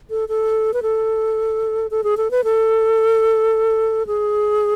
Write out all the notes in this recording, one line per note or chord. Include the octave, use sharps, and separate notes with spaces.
A4
A4
B4
A4
A4
G#4
A4
B4
A4
G#4